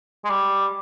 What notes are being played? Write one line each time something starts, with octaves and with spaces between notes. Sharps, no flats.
G#3
G3